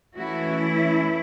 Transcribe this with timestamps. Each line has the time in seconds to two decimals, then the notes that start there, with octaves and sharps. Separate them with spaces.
0.16 E3 A3 C#4 E4 F#4